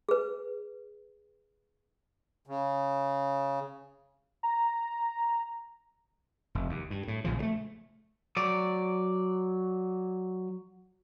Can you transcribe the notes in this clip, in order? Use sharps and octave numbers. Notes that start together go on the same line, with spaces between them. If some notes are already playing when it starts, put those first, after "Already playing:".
G#4 B4
C#3
A#5
F1
D#2
G2
A2
A#1 C#3 F3
F#3 A3
F#3 D5